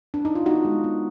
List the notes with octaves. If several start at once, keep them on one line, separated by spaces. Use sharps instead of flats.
D4
D#4
F4
B3 D#4 F#4
G#3
B3